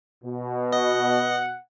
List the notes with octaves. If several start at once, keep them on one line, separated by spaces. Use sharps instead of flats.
B2
D#5 F#5